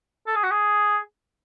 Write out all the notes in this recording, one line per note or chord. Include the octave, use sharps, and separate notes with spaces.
A4
G#4
F#4
G#4